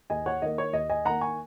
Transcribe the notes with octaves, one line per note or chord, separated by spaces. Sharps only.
D#2 D#5 G#5
C#5 F#5
D#3 A#3 D#5
C#5
D#2 D#5
D#5 G#5
D#3 A#3 F#5 A#5
G#5 C#6